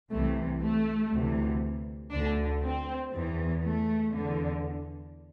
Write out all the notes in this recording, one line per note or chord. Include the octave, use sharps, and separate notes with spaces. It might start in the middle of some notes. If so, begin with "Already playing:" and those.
C2 C3 E3 A3
A3
D2 C3 E3
D2 D3 D4
C4
E2 E3
A3
E2 D3